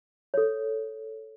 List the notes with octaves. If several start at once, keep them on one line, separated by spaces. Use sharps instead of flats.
A4 C#5